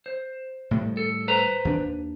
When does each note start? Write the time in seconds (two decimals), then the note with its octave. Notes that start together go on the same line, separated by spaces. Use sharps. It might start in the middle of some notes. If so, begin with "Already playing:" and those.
0.06 C5
0.71 A2 D#3 G3
0.97 A4
1.28 B4 C5 A#5
1.65 D#2 D4